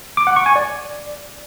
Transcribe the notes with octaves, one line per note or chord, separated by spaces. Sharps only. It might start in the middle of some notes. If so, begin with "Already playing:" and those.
D6
F#5
C#6
G#5
D5